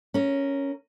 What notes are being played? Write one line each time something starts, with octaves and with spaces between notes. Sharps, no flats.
C#4 A#4